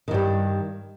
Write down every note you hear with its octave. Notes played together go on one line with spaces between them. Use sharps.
G2 D#3 G3